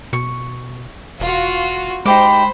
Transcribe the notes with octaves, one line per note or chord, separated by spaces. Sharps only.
B2 C#6
E1 F4 F#4
G#3 D#4 G4 C5 B5 D6